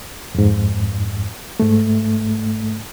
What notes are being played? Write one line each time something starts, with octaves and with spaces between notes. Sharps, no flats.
F2 G#2
G#2 A3